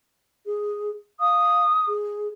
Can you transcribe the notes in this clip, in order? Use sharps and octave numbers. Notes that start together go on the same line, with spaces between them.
G#4
F5 D#6
G#4